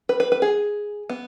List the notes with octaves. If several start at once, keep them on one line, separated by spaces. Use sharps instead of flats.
B4
B4
B4
G#4
B3